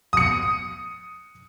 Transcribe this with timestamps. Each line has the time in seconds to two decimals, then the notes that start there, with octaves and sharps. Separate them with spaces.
0.13 D#6 C#7